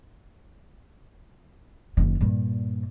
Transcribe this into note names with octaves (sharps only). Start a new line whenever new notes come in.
F#1 D#3
G2 A#2